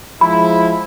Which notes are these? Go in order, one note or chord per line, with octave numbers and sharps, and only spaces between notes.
F3 G#3 E4 B5